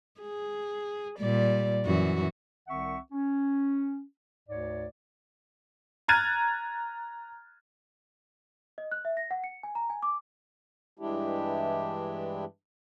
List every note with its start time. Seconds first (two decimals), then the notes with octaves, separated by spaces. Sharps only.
0.21 G#4
1.19 A#2 G3 D5
1.86 F#2 E3 F#4
2.67 C2 D#3 C4 E5 F#5 C#6
3.12 C#4
4.49 D2 G#2 C#5 D5
6.08 A#5 F6 F#6 G#6 A6 D#7
8.78 D#5
8.91 F#6
9.05 E5
9.17 A#6
9.31 F#5
9.44 C#7
9.63 G#5
9.75 A#5
9.90 G#5
10.03 D6
10.99 G2 E3 G#3 D4 E4 G4